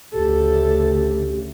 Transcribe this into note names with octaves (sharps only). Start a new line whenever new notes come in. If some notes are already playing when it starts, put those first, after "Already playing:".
D2 C#3 G4 A4